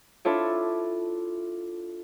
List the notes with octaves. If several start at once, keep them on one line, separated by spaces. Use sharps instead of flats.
D4 E4 F4 A4 C#5